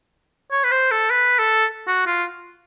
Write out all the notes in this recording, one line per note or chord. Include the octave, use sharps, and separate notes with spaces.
C#5
B4
C5
A4
B4
A4
F#4
F4